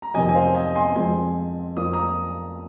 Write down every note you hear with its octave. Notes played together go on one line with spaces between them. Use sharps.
A#5
F2 C3 D#3 D#5 G#5
G#5
C5 F5
D#5 G#5
G#5 C6
F2 F3 G#3 C4 G#5 C6
F2 F3 A#3 D#6
A#5 D#6